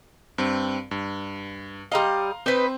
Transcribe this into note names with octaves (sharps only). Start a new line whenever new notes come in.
G2 C4
G2
G3 D#5 F5 A#5 C6
C4 D#4 B4 C5